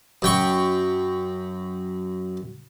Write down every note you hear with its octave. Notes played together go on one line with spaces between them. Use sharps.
F#2 G5 C#6